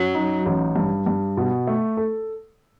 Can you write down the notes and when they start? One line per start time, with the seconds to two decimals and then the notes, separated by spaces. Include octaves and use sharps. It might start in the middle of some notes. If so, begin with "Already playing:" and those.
Already playing: F#2 F#3
0.15 D#4
0.46 A1
0.76 G2
1.06 G2
1.37 B2
1.67 A3
1.97 A4